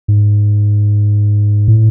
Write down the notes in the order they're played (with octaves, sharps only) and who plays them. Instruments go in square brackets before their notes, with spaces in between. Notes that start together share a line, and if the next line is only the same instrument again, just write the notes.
[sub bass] G#2
A2